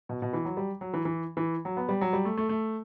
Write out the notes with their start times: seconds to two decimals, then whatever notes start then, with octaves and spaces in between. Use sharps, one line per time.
0.09 B2
0.22 B2
0.33 E3
0.45 F#3
0.57 G3
0.81 F#3
0.94 E3
1.05 E3
1.37 E3
1.65 F#3
1.77 B3
1.89 G3
2.01 F#3
2.13 G3
2.25 A3
2.37 A3
2.49 A3